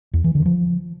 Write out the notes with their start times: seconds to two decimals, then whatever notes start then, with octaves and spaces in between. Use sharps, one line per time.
0.14 E2
0.24 E3
0.35 D3
0.46 F3